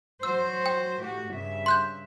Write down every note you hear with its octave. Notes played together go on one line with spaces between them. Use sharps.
F#3 F#4 C5 E6
G5
A2 F#4 G4
G2 C#3 E5
C6 F#6 G6